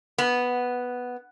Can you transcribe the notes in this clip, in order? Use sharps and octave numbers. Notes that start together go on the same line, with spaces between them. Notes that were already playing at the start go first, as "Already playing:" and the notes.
B3